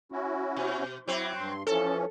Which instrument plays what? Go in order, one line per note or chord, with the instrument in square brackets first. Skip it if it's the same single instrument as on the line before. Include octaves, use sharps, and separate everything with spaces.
[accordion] C#4 E4 F#4
[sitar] B2
[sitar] F#3 C4 [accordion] E4 D6
[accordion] G2 C6
[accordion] E3 F3 C#4 [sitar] A4